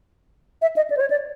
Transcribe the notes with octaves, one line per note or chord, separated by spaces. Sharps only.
E5
D#5
D5
C5
C#5
D5